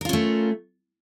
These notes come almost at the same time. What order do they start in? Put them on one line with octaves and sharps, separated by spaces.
A#4 F4 C#4 A3